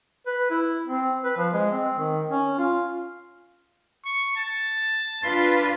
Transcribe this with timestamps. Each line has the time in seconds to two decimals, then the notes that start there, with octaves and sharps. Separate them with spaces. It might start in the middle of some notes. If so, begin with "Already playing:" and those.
0.26 B4
0.51 E4
0.87 C4
1.24 B4
1.37 F3
1.53 G#3
1.72 C4
1.98 D#3
2.31 C#4
2.59 F4
4.06 C#6
4.37 A5
5.24 D4 F4 B4 C6